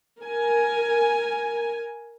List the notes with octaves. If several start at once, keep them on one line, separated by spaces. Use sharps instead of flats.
A#4 G#5